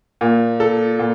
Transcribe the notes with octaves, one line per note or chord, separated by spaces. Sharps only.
A#2
A4
A#2